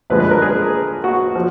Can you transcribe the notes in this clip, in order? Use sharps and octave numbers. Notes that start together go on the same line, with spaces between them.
F#2 D3 F3 G#3 B4
B4
A#4
G#4
F#4
F3